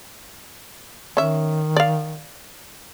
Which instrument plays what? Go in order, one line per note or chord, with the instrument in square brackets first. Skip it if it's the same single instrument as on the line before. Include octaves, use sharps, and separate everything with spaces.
[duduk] D#3 [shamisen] C#4 E5
[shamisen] D5 F5